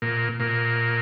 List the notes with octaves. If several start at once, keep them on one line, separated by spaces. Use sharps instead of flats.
A#2
A#2